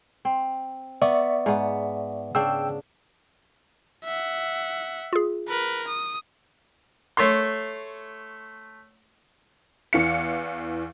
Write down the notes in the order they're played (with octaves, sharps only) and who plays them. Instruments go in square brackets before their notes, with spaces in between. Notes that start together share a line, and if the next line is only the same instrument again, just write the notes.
[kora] C4
[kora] B3 [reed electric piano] D5 E5 C#6
[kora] G#2 B3
[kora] C#3 D4 [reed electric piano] G5 E6
[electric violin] E5 F#5
[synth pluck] F4 G#4
[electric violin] A#4 B4
D#6
[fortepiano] A3 C#5 C6
[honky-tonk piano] E2 E3 F5 C#7